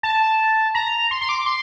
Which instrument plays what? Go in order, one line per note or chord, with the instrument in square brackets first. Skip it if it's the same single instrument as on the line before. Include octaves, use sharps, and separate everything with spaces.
[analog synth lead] A5
A#5
C6
C6
D6
C6